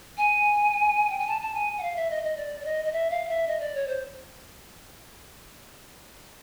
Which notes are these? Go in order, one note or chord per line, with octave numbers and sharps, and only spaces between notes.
G#5
G5
G#5
A5
A5
G#5
F#5
F5
E5
D#5
D#5
D5
D5
D#5
D#5
E5
F5
E5
D#5
D5
C#5
C5